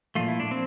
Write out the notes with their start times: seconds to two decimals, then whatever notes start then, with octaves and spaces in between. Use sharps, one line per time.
0.15 A#2 F3 A3 F4
0.28 E4
0.40 D4
0.51 C4